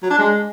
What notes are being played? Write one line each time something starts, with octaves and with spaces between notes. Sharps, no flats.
F#3
D4
G#3